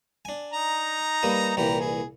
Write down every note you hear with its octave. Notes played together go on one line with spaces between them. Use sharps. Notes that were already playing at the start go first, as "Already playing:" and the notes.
D4 G#5
D#4 A#5
G3 A#3 B4
C2 A#2 E3 G4 A#5
G#4